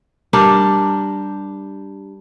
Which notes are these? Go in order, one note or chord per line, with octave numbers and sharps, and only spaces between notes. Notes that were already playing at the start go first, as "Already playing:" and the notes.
G3 D4 G4 A#4